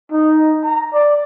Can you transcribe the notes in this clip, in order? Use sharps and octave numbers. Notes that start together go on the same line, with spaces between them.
D#4
A#5
D5